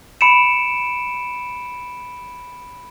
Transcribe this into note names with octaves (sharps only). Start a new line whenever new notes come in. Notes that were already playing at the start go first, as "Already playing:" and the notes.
B5 C#7 D7 E7